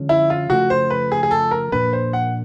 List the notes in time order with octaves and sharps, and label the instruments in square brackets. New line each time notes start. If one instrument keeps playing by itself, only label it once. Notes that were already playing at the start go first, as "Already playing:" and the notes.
Already playing: [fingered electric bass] D3 F3 G#3 C#4
[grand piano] E4
F4
[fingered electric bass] C#3 F3 A3 [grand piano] F#4
[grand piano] C5
B4
G#4
G#4
A4
A#4
[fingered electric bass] A#2 F3 A#3 D4 [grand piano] B4
[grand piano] C5
F#5